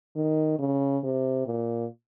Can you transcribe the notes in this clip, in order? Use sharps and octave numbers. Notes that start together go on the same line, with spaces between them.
D#3
C#3
C3
A#2